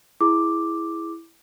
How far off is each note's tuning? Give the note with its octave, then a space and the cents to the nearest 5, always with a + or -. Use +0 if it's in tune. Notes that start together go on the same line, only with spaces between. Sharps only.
E4 +0 G#4 +0 D6 +5